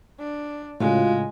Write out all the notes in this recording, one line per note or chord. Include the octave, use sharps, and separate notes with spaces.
D4
A2 C#3 G#3 F4 F#4 F5